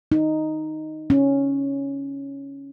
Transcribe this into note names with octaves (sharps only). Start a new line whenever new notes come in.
D#4
C#4